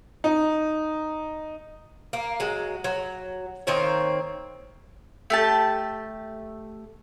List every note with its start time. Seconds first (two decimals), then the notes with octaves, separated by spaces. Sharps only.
0.24 D#4
2.13 A#3
2.40 F#3 G#3
2.84 F#3
3.67 D#3 A#3 C4 C#5
5.30 A3 G4 A5